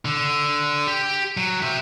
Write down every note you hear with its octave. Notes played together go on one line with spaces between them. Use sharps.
D3
G4
F#3
G4 E5